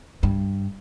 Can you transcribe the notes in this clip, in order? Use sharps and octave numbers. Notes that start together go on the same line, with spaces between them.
G2